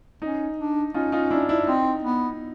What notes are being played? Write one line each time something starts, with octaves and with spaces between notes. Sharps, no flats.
C#4 D#4
D4
C#4 D#4 F4
D#4 F4
D4 E4
D4 E4
C4 D#4
B3